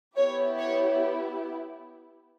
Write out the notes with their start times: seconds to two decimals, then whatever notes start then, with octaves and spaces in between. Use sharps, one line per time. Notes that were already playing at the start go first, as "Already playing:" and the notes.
0.16 B3 E4 G4 C#5
0.58 C#5